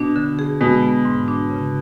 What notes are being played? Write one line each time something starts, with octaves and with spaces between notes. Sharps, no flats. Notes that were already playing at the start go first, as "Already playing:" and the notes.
Already playing: B2 D4
D3
G#4
B2 G#3
B3
G#2
D4
C#3